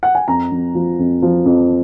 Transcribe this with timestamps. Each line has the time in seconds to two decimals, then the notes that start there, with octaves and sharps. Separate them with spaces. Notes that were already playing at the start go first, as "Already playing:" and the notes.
0.03 F#5
0.15 G#5
0.28 F2 A#5
0.51 F2
0.75 F3
0.99 F2
1.22 F3
1.46 F2